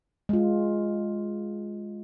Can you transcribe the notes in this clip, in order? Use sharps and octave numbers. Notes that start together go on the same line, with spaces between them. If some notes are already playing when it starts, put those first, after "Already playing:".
G#3 F4